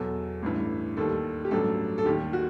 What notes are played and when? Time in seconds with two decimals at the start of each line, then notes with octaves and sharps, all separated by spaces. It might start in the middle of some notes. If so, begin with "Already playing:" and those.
Already playing: E2 B2 F#3 A4
0.42 A1 G2 E3
0.97 D#2 D#3 G3 A4
1.45 G4
1.51 A1 G2 F#3 A4
1.98 A4
2.05 D#2 D#3 G3 G4
2.33 F#4